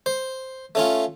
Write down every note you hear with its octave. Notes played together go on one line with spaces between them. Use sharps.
C5
A3 C#4 F4